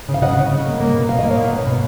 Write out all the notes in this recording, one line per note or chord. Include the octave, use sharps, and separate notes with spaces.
C#3
F5
C#3 D#5 F#5
C#3
C#3
A#3
A#3
B2
B2 F5
A#3 D#5
C#5 F5
B2
B2
B2